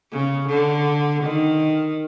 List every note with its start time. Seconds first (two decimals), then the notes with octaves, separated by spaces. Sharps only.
0.12 C#3
0.49 D3
1.24 D#3